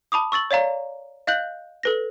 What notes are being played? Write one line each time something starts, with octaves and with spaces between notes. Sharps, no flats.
A5 B5 D6 D#6
C#6 E6 A6 F#7
C#5 D5 F5 A#5
D#5 F5 F#6 G6 F#7
A4 B4 A#6